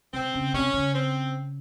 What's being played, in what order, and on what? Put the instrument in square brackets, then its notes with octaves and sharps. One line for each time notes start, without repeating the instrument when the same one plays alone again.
[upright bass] C3 [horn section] C4
[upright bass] C#3
[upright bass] C3 [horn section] C#4
[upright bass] C#3
[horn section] C4